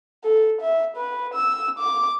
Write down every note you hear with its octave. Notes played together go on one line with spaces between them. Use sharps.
A4
E5
B4
E6
D6